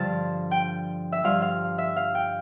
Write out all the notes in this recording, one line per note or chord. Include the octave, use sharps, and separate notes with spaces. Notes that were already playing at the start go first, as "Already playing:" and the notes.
Already playing: G2 D3 F3 A5
G5
E5
G2 F3 F5
F5
E5
F5
G5